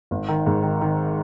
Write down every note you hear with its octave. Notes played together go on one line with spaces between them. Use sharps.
G#1
D#3
G#2
D#3
D#3